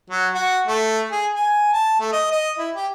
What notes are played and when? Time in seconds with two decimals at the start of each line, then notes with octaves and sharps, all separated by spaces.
0.10 F#3
0.34 F#4
0.67 A3
1.11 G#4
1.35 G#5
1.73 A5
2.00 A3
2.12 D#5
2.31 D#5
2.58 E4
2.75 G4